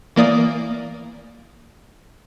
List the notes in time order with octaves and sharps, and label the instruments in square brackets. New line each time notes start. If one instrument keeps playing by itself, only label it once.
[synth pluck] E3 A#3 D5 D#6